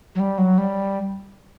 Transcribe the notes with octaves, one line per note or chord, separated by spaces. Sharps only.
F#3
G3
F#3
G3